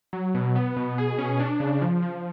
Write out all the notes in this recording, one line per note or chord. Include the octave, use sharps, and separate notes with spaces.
F#3
B2
B3
B2
G#4
C#4
D4
C#3
F3
F3